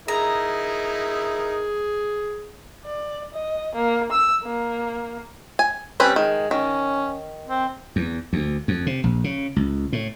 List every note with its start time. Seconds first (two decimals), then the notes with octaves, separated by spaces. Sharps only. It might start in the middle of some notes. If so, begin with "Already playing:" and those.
0.08 D#4 E4 G#4 A#4 A#5
2.85 D5
3.34 D#5
3.75 A#3
4.12 E6
4.43 A#3
5.59 G#5
6.00 G3 C4 C#4 B4
6.16 D#3 G#3
6.51 D#3 C#4
7.47 C4
7.96 E2
8.33 D2
8.68 F2
8.86 C3
9.04 A#1
9.24 C#3
9.56 C#2
9.92 A2